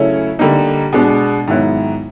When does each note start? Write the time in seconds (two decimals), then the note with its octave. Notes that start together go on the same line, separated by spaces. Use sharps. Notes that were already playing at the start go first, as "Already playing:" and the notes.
Already playing: C#3 F#3 A3 C#4 E4
0.39 D3 G3 A#3 D#4
0.93 B2 G#3 B3 D4
1.48 G#2 D#3 F#3 B3 E4